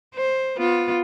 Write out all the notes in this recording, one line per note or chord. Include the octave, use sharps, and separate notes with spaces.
C5
B3 F4